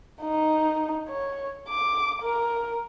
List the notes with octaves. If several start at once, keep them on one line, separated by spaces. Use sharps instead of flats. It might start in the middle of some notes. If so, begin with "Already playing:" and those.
D#4
C#5
D6
A#4